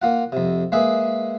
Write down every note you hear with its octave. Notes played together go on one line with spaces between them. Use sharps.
A#3 F4 F#5
F2 C3
G#3 A#3 G#4 B4 E5